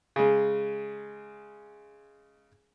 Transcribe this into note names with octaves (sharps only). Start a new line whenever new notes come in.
C#3 G#3